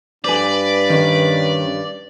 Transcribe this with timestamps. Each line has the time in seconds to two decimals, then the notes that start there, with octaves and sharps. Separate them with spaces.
0.24 G2 B4 C5 D5 G#5
0.89 D#3 C#4 A#4